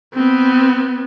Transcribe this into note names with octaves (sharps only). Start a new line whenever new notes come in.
B3 C4